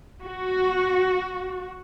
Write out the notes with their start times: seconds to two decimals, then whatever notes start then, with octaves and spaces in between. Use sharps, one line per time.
0.22 F#4